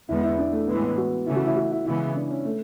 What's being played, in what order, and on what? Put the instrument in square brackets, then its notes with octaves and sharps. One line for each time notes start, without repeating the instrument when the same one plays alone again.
[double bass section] E2 D3 G#3 B3 [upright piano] E4
[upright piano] E4
D4
A3
[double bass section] A2 E3 G#3 [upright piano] B3
[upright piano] B3
F#4
[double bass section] C#3 E3 A3 C#4 [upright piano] E4
[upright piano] F#4
E4
F#4
E4
[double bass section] C#3 E3 G#3 B3 [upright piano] E4
[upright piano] D4
C#4
A3